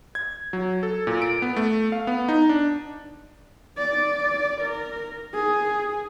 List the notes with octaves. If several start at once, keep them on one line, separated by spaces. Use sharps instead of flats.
G#6
F#3
A4
A#2
D7
B3
A3
F5
B3
D#4
D4
D5
A#4
G#4